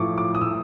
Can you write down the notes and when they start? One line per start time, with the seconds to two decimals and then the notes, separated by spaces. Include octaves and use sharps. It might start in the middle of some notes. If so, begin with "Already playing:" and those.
Already playing: A2 F3 C#6 D6
0.18 D6
0.35 D#6
0.41 A2 E6